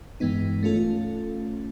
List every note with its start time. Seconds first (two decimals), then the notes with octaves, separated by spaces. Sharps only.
0.20 G2 E3 G#3 B3 D#4
0.63 A3 C#4 F4 A4